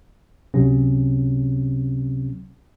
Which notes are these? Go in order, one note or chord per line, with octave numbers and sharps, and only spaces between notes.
C#2 C3 F#3 C#4